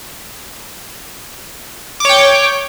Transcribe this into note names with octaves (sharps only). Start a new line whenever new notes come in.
C#5 G5 D6